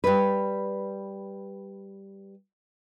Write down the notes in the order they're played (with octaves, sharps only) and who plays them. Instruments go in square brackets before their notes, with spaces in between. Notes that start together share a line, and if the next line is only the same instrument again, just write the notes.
[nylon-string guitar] G3 B4